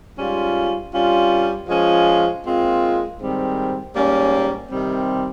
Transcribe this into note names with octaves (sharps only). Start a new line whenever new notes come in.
G#2 G3 C#4 F4
G2 G3 C#4 F4
F3 G#3 C#4 F4
A#2 G#3 C4 F4
G#2 D#3 G3 C4
G#2 G3 A#3 C#4
C3 D#3 G3 C4